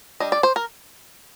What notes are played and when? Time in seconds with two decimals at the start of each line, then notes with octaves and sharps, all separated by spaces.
0.20 G3 D4 D#5
0.32 D5
0.43 C5
0.56 A#4